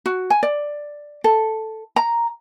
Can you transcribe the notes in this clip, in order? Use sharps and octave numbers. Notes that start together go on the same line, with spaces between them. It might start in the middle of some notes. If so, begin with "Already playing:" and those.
F#4
G#5
D5
A4
A#5